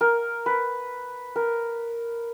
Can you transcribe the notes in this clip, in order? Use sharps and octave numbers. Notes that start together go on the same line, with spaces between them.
A#4
B4
A#4